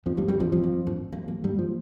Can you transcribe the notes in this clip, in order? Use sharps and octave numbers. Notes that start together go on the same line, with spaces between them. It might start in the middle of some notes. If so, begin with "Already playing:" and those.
F2 F3 A3
G2 G3 A#3
G2 G3 C4
F2 F3 D4
F2 F3 C4
A#3
D4
A#3
A#3
G2 G3
F3